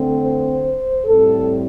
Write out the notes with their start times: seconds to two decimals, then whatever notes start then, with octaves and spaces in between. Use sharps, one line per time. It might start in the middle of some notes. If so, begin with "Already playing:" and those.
Already playing: D3 A3 C4
0.20 C5
1.05 A2 G3 C4 A4